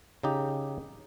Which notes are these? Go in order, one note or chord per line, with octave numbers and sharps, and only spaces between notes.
C#3 D#4 G4